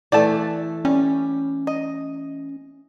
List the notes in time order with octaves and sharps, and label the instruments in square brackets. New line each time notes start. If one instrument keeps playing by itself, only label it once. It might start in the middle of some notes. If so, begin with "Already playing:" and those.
[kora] E3 A3 A4 [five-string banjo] D5 G5 A5
[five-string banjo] G3 [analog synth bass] C#4
[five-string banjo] D#5